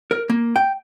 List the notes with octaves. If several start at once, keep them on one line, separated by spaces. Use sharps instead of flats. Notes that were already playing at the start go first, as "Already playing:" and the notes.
A#4
A#3
G5